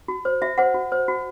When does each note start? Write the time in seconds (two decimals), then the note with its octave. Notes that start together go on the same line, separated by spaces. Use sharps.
0.08 F#4
0.25 C5
0.42 F#4 E5
0.58 C5 F#5
0.74 F#4
0.92 C5
1.08 F#4